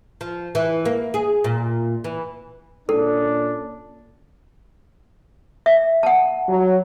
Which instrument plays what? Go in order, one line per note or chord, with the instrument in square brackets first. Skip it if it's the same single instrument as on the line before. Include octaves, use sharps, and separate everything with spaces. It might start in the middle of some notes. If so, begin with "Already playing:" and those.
[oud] F3
E3
A#3
G#4
A#2
E3
[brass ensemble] A#2 C#4 D4 [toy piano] A4
[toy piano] E5
F#5 A5
[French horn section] F#3